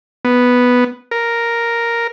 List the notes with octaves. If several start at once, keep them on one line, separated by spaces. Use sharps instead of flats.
B3
A#4